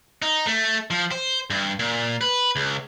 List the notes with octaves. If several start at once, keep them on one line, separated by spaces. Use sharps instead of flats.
D#4
A3
F3
C5
G2
A#2
B4
C#2